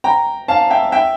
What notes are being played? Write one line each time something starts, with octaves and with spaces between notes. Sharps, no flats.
G5 A#5
F5 A5
E5 G5
E5 G5